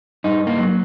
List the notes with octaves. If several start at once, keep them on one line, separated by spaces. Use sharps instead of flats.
G2 D#4
A#3
F#3